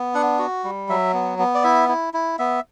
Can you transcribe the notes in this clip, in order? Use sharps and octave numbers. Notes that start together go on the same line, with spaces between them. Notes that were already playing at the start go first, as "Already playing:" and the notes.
Already playing: B3
D4 F#5
F#4
G3
F#3 E5
B3
B3
D5
E4 E5
E4
E4
B3 E5